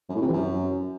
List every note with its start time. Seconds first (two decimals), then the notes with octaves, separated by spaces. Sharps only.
0.09 F#2
0.15 A2
0.21 C3
0.27 E3
0.33 F#2